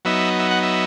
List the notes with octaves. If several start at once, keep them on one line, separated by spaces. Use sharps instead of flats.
F#3 B3 D#4 E5
E5
F#5
E5